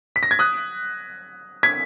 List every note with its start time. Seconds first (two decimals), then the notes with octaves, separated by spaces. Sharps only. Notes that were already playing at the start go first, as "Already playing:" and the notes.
0.16 B6
0.23 A#6
0.31 G#6
0.39 D#6 F#6
1.63 G#6 B6